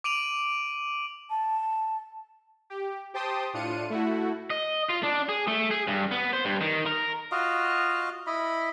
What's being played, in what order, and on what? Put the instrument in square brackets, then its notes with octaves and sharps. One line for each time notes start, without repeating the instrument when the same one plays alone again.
[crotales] D6 D7 D#7 F7 F#7
[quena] A5
[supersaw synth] G4
G4 C5 G5 A5 C6 D#6
A2 D4 F4 C#7 D#7
A3 E4 F#4
[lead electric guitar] D#5
F4
D4
G#4
A3
G#4
G2
B3
C5
G2
D#3
A#4
[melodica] F4 F#4 D#5 F5
E4 D#5 B5